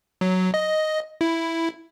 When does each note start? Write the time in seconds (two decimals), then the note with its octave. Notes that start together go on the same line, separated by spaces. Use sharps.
0.21 F#3
0.54 D#5
1.21 E4